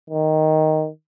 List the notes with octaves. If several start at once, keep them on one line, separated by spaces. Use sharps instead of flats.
D#3